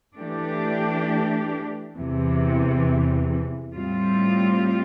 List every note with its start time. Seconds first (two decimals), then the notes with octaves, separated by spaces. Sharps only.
0.16 E3 A3 D4 G4
1.94 E2 C3 E3
3.73 A2 G3 C4 F4